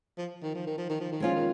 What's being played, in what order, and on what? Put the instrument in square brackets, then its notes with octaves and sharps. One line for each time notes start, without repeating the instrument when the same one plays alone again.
[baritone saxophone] F3
D#3
F3
D#3
F3
D#3
F3
D#3
[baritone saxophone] F3 [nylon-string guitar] G#3 C#4 F4
[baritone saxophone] D#3